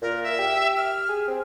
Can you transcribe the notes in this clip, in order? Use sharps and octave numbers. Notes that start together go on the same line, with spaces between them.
A#2 A#4
E5
G4
F6
G#4
C4